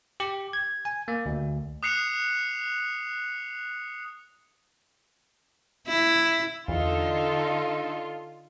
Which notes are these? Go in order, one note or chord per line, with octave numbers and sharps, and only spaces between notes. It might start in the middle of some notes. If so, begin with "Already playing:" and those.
G4
G#6
G#5
A#3
D2
D#6 F#6 C7 C#7 F7
E4
E2 D3 D#4 F4 A4